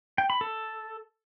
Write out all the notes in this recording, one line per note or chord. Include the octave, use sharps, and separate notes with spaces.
G5
B5
A4